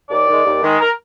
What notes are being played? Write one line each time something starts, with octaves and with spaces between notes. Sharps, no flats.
D#2 D5
D#3 G#3
D#2
D#3 G#3
A#4